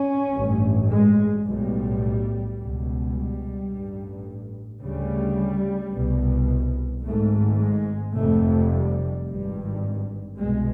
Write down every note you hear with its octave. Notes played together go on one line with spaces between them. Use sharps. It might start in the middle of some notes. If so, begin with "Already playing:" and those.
Already playing: C#4
A1 G2
G#3
B1 A2 G3
C#2 B2
G3
A1 G2
D2 C#3 G3
C2 B2
G#1 G#2 A3
G#3
F1 F2 C3 A3
G3
G#1 G2 G3
C2 B2 G#3